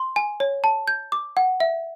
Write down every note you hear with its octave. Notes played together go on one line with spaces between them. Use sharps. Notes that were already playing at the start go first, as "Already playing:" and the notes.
Already playing: C6
G#5
C#5
A5
G6
D6
F#5
E5